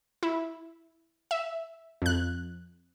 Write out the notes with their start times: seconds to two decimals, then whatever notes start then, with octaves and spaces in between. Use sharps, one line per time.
0.23 E4
1.31 E5
2.02 F2 F#6